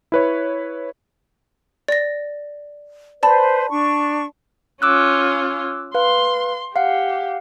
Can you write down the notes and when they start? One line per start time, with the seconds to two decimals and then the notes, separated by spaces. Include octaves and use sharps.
0.12 E4 B4 C#5
1.88 D5 A#6
3.23 B4 C5 D5 A5 B5
3.70 D4 C#6
4.82 C#4 F4 D6 E6 F#6
5.95 B4 F5 C6
6.76 G4 F5 F#5